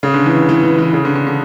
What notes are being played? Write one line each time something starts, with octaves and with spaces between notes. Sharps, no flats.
C#3
D3
E3
E3
E3
E3
E3
C#3
D3
D3
D3